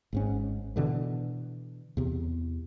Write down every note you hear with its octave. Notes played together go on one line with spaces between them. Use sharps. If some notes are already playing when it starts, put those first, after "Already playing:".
G#1 G#2 C#4
B2 D3 E3
E2 C3